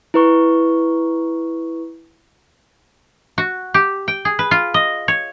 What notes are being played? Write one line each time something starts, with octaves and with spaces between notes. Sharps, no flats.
E4 B4 C#6
F#4
G4
G5
G#4
B4
F4
D#5
C#5